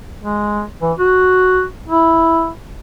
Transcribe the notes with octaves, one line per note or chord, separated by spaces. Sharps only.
G#3
E3
F#4
E4